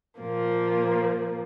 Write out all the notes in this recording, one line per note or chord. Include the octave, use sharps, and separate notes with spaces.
A#2 F3 A#3